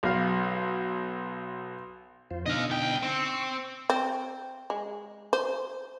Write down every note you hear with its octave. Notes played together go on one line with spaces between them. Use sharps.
B1 F5
F2 F4 C5
B2 D3 D#4 D#5 F5
C2 G5
C4 C#6 E6
C4
G#3
C5